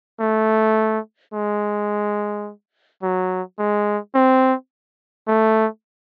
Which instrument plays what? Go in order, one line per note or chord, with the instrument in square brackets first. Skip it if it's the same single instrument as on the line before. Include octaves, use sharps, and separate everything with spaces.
[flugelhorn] A3
G#3
F#3
G#3
C4
A3